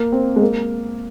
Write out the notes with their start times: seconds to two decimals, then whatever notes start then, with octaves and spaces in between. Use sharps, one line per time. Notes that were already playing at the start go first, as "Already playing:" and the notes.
Already playing: A#3
0.12 C4
0.36 G#3
0.42 A#3